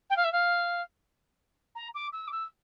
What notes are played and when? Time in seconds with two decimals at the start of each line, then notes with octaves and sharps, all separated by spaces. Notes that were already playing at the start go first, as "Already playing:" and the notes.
0.10 G5
0.16 F5
0.24 E5
0.32 F5
1.75 A#5
1.94 D6
2.12 E6
2.27 D6
2.31 E6